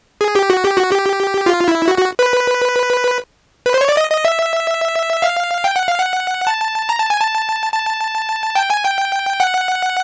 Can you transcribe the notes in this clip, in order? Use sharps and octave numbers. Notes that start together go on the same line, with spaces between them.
G#4
G4
F#4
G4
F#4
G4
F4
E4
F#4
F#4
B4
B4
C5
C#5
D5
D#5
D#5
E5
F5
G5
F#5
F5
F#5
A5
A#5
A5
G#5
A5
A5
G5
G#5
G5
F#5